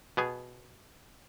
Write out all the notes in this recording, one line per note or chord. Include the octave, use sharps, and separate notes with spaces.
B2 B3 G#4